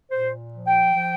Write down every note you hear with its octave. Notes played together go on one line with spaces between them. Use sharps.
A#2 C5
F3
G5
F3